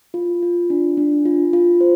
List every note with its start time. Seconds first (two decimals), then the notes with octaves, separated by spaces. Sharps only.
0.14 F4
0.43 F4
0.70 D4
0.97 D4
1.25 F4
1.53 F4
1.81 C5